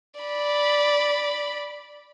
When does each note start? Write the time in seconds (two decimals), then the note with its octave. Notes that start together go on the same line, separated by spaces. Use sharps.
0.20 D5 B5